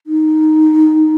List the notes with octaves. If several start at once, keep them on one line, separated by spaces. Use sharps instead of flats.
D#4